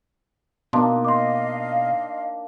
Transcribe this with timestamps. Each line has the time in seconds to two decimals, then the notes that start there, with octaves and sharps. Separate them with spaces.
0.73 B2 A#3 D4 D#4 C6
1.04 D#5 F5 C6 D6